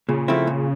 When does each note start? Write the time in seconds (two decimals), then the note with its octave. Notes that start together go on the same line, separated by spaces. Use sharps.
0.08 A#2 C#3
0.28 F3 A3 C4 E4
0.47 A#2